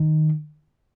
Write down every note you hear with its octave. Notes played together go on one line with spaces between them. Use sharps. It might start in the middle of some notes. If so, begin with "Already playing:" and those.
Already playing: D#3